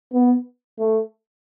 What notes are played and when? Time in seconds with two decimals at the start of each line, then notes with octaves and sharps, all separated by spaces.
0.13 B3
0.78 A3